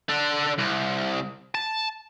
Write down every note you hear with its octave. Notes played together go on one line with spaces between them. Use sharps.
D3 D4
C2
A5